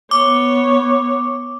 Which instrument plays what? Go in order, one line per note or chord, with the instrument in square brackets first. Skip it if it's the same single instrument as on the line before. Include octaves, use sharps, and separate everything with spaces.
[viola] B3 C#5 [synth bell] D6